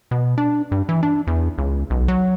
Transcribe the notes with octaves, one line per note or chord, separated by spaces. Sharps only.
B2
D4
G2
E3
D4
E2
C#2
B1
F#3